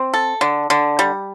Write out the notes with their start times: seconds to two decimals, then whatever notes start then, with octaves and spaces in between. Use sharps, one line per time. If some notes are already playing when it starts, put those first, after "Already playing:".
Already playing: C4
0.14 A4
0.41 D3
0.70 D3
0.99 G3